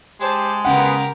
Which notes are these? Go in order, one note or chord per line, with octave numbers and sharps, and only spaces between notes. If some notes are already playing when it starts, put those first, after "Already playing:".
G#3 G4 C5 A5
C#3 B3 G4 A#4 F#5